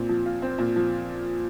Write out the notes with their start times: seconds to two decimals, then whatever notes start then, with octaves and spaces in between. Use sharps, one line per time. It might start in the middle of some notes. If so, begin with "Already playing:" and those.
Already playing: A#2 C4
0.09 F3
0.26 F4
0.42 C4
0.58 A#2
0.76 F3